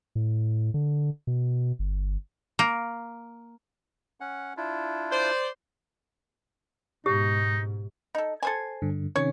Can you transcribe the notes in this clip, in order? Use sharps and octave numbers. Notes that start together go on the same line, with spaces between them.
A2
D3
B2
G1
A#3
C#4 F#5
D4 E4 F4
C5 D5
G#2 B2 D#4 G4
D#4 A4
A4 C5 G#5
G2 D3
C3 D#3 C#4 C#5